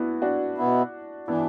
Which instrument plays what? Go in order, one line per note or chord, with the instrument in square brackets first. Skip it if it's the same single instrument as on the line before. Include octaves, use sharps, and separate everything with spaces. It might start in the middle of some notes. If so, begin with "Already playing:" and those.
Already playing: [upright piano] B3 D4 E4 F#4
D4 F#4
[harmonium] B2 B3 E4
[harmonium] E3 D4 [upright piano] B3 E4